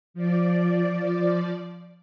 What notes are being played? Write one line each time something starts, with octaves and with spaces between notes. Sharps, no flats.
F3 D5